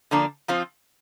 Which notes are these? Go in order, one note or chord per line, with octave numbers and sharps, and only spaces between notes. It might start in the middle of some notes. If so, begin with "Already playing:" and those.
D3 F3 A#3 D4
F3 C4 F4 C5